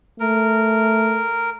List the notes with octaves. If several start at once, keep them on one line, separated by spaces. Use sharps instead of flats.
A3 A#4